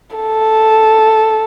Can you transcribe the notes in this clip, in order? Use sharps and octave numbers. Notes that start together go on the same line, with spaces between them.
A4